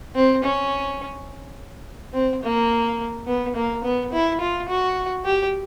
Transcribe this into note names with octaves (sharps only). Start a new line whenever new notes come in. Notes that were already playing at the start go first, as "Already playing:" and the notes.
C4
C#4
C4
A#3
B3
A#3
B3
E4
F4
F#4
G4